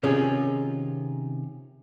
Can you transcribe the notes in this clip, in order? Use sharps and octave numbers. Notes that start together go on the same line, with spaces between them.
C3 D#3 C#4 D#4 F4 G#4